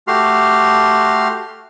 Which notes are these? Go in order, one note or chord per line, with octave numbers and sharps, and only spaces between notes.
A3 F#4 G4 C6 F6